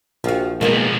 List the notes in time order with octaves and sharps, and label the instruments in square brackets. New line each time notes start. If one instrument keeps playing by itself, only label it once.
[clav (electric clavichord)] A#1 F5 [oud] F3 F#4
[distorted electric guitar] B1 F3 [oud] D#3 A#3 B3 [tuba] G#3